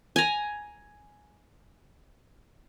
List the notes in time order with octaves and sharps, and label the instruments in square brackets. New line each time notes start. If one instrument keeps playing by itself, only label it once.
[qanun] G#5 A#5